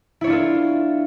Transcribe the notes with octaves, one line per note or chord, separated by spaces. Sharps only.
D4 E4 F4 A4 C#5